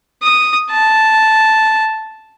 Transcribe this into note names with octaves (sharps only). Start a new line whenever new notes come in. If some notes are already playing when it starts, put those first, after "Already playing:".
D#6
A5